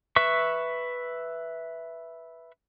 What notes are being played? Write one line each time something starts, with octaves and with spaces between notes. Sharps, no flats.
B4 E5 C#6